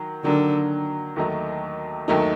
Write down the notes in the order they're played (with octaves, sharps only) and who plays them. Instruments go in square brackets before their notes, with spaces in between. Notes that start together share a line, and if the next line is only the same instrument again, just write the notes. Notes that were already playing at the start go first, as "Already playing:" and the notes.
Already playing: [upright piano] D#3 F#3
[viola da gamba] D3 [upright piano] D#3 F#3 A#3
[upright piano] D#2 D#3 F#3 A3 D#4
D#2 D#3 F#3 A3 D#4